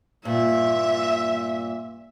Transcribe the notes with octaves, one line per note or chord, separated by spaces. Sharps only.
G2 A#2 E5